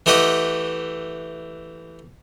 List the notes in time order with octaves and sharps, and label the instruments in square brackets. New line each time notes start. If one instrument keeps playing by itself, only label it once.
[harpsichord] E3 A3 G4 D#5 F#5